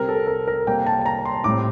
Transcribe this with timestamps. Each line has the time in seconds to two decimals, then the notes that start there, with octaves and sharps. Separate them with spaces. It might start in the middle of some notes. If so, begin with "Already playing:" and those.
Already playing: C3 G3 C4 A#4
0.09 A4
0.27 A#4
0.48 A#4
0.67 C3 G3 A#3 G5
0.79 G5
0.86 A5
1.01 A5
1.06 A#5
1.25 C6
1.44 A2 G3 C4 D6